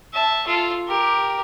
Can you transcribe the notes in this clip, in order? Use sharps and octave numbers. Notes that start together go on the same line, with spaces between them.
E5 A5
F4 A4
G4 A#4